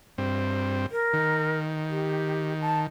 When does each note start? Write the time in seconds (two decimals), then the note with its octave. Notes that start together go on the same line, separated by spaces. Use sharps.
0.18 G2 C4
0.91 A#4
1.13 D#3
1.90 G4
2.61 A5